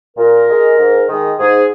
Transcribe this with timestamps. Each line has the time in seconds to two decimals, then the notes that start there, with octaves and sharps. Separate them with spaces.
0.17 A#2 A#4
0.47 G#3
0.77 G#2
1.07 D#3 G#3
1.37 G#2 G#4